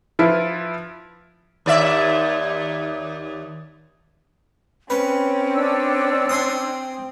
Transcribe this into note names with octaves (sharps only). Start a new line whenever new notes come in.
F3 E4 F4 B4
D#2 D5 E5
C4 C#4 B4
D4 E6
G#5 C6 D#6